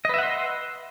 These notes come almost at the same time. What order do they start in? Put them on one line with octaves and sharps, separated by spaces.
D#5 B4 E5 F#5 C6